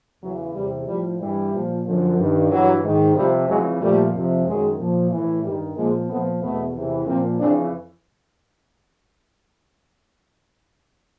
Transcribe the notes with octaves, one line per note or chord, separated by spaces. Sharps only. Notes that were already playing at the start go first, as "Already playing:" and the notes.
E2 C#3 E3 F#3
E2 C3 E3 G3
A2 F3 G3
G2 E3 G3
A#2 F3
F#2 D3 F3
G2 D#3
G2 E3 F#3
G#2 D#3
F2 C3 F3 G3
F2 C#3 E3 F#3 G#3
A#2 F3 G3 A3
F2 C3 F3
F#2 D#3 F#3 G#3
A#2 F3
A2 E3
G2 D#3 G3
A#2 F3 G#3 A#3
A#2 F3 A3 B3
E2 B2 A3 B3
E2 C3 E3
A#2 F3 A#3 C4
F2 C#3 E3 C4 D4